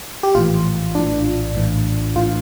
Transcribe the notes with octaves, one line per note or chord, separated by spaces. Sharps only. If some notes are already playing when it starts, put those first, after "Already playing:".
G4
A#1 A2 E3 F4
A#1 A2 E3 D4
A#1 A2 E3
A2 E3 F4